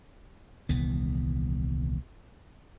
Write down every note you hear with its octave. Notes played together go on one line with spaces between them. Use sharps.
D#1 C2 E3 B3